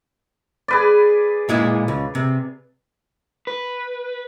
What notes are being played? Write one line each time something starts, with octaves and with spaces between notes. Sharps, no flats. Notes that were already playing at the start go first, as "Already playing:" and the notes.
G#4 B4 D5
A#2 G#3 E4
C#2
C3
B4